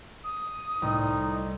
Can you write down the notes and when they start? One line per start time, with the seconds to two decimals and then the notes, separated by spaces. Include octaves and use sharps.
0.24 D#6
0.82 C2 A2 D#4